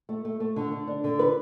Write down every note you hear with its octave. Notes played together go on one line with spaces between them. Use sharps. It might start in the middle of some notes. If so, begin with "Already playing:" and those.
A3
A3
A3
D3
D3
D4
D3
B4